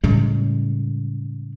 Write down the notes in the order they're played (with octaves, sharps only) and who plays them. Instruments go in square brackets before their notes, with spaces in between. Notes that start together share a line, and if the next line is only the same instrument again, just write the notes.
[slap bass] A2 C#3 G3 G#3